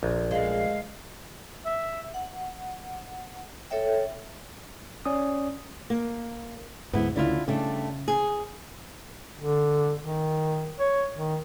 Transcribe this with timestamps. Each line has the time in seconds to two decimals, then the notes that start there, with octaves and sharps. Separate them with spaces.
0.03 A#1 F2
0.31 G#3 A3 F5
1.66 E5
2.14 F#5
3.70 A4 C#5 E5 G5
5.05 C#4 D5 D#6
5.90 A#3
6.93 D2 G#2 B3 E4
7.16 D2 C#3 D4 E4 F4
7.48 C#3 G3 A3 D4
8.08 G#4
9.38 D3
10.00 D#3
10.79 C#5
11.17 D#3